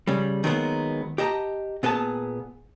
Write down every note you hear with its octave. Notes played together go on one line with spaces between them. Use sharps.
C#3 G3
D#3 F#3 G#3 A#3 B3
G4 D#5 A5 A#5
A#2 B3 G#4 C5 A5